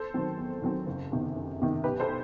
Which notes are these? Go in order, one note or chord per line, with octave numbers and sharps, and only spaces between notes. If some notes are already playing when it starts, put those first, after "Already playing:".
Already playing: A4 C5
D#3 F#3 C4
E2
D#3 F#3 C4
F#1
E2 C3 D#3
F#1
E2 C3 D#3
B1 G4 B4
A4 C5
B2